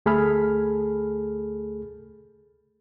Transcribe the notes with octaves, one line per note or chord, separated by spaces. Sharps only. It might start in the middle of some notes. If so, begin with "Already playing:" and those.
D2 A3 G#4 A4 B5 F6